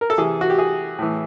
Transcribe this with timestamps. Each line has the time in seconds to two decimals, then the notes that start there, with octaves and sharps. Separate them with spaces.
0.01 A#4
0.10 A4
0.18 C3 E3 G#4
0.41 F#4
0.50 G4
0.58 G#4
0.99 A2 E3